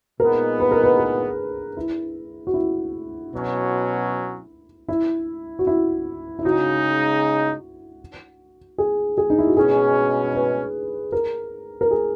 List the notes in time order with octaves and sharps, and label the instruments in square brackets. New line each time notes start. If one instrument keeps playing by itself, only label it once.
[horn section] A#2 G#3 B3 D#4 [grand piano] A#4
[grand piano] B4
A#4
B4
G#4
E4
F#4
E4
[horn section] B2 F#3 C#4
[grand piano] E4
F#4
E4
E4
[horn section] C#3 G#3 D#4 [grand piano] F#4
[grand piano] G#4
G#4
D#4
E4
F#4
[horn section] B2 G#3 C#4 [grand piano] G#4
[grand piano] B4
A#4
A#4
G#4